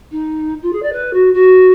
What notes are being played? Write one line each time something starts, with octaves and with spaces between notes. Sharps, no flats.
D#4
F4
G#4
D5
B4
F#4
F#4